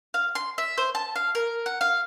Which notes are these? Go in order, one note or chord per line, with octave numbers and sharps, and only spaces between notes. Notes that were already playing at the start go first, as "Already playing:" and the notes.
F5
C6
E5
C5
A5
F5
A#4
F#5
F5